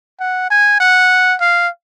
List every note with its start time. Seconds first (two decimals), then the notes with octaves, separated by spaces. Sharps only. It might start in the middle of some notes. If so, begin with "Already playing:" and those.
0.20 F#5
0.51 G#5
0.80 F#5
1.41 F5